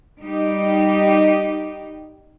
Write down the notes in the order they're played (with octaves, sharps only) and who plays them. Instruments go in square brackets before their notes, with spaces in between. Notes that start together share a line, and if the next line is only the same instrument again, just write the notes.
[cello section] G3 D#4 G4